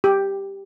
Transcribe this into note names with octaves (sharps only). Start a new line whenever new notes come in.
G4